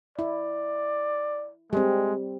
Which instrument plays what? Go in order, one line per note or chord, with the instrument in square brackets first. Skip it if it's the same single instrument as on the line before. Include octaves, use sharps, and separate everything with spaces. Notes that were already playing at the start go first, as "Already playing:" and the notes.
[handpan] E4 [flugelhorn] D5
[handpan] G3 C4 [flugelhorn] G#3